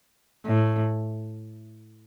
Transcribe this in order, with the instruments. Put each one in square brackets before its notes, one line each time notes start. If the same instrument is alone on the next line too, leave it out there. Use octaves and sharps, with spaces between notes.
[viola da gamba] A2